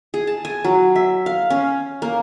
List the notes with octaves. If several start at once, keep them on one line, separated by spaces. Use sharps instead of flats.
G#4
A5
G#5
F#3
E5
F5
C#4
A#3